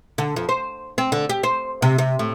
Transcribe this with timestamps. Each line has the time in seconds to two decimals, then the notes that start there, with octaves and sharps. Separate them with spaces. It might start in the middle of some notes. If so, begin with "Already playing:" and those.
0.18 D3
0.36 F2
0.49 C5
0.98 C4
1.12 D3
1.29 G4
1.43 C5
1.82 C3
1.98 C3
2.19 A2